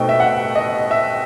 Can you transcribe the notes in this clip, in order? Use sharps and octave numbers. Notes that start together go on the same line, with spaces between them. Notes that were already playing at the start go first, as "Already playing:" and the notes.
Already playing: B2 A3 C4 D#4 G5
E5
F#5
D#5
E5